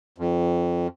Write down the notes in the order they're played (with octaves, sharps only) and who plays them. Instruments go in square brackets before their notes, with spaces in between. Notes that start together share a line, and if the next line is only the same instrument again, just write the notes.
[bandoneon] F2